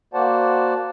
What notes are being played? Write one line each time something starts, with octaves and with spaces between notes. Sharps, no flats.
A#3 F#4 C5 D5 F#5 A5